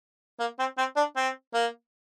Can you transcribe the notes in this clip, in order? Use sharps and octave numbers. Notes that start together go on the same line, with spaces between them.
A#3
C4
C4
D4
C4
A#3